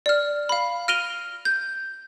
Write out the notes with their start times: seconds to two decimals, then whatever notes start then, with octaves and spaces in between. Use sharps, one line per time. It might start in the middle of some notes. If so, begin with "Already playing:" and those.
0.06 D5 F6
0.49 F5 B5
0.88 F6 A#6 D7 D#7 F7 G7
1.45 G6